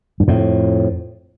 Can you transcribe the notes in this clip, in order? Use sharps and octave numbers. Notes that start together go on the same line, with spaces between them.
G2
F2 A2